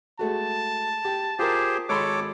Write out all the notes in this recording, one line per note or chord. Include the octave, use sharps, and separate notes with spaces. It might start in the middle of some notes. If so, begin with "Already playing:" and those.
G#3 A3 F#4 A5
G4
F4 G4 G#4 A#4 C5
G#1 A4 C#5 B5 C6 D6